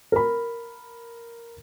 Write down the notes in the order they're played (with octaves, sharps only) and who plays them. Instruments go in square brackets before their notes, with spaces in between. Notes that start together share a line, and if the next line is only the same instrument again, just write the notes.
[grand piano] A#4 B5